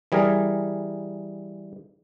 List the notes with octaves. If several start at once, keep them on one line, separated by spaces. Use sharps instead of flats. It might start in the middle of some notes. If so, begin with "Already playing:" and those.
E3 G3 G#4 A#4